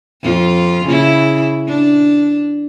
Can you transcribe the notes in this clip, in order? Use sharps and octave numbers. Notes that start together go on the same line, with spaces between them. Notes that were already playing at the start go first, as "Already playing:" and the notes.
F2 F4
C#3 E4
D4